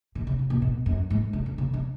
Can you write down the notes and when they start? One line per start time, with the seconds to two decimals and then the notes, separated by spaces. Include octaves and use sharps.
0.15 D#3
0.27 C#3
0.39 C#3
0.50 B2
0.62 B2
0.86 F#2
1.10 G#2
1.33 C#3
1.46 D#3
1.58 C#3
1.73 C#3